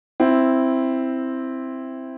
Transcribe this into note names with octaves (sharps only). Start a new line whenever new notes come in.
C4 E4